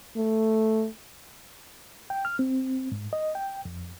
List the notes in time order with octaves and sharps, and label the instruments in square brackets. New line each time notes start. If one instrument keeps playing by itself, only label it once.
[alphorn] A3
[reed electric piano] G5
F6
C4
G#2
D#5
G5
F2